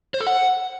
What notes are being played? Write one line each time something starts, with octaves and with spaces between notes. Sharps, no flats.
C5
A4
F#5